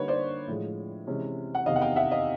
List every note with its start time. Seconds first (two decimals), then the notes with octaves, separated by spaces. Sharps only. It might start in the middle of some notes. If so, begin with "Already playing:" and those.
Already playing: D3 G3 A#3 D#4 B4 C#5
0.08 C5 D5
0.48 A2 F3 G#3
1.07 C3 E3 G#3 C#4
1.55 F#5
1.66 E2 C3 D#3 D#5 F5
1.76 F#5
1.81 F5 G5
1.96 E5 F#5
2.11 D#5 F5